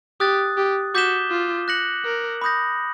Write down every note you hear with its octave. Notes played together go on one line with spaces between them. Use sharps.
G4 D#6 F#6 A6
G4
F#4 D6 G6 B6 E7 G7
F4
F#6 A#6 C#7 F#7
A#4
B5 D#6 G6 A#6